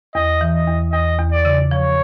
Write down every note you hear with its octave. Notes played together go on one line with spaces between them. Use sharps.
E2 D#5
E3
D#5
E2
E2 D#5
E2
D5
C#3
F3 C#5